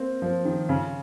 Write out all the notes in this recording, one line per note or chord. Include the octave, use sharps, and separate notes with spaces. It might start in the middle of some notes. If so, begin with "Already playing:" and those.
Already playing: A#3 C4
F3
D#3
C#3